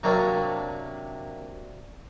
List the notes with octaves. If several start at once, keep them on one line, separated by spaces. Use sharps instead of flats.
C3 F#3 A#3 D4